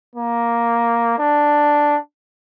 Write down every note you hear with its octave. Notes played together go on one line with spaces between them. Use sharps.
A#3
D4